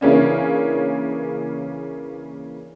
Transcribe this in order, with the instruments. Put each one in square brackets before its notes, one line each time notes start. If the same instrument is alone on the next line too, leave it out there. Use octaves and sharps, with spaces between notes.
[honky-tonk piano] C#3 E3 A#3 C#4 D4